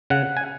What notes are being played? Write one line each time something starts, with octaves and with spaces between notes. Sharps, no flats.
C#3 F#5
G#5